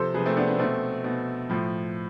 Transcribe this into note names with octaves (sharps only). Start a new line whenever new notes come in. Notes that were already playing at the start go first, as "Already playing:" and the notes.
Already playing: C3 F3 A4 C5
C3 F3 G#4 B4
A3 C4
B3 D4
B3
B2 A3 C4
B2
A2 F3